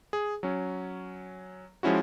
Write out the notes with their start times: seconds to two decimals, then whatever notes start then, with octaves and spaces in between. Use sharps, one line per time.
0.13 G#4
0.43 F#3 C#4
1.83 F3 G#3 C#4 E4 F#4